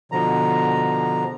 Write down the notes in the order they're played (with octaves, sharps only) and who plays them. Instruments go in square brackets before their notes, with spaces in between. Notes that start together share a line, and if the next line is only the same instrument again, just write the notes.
[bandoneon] B2 D3 F3 A#5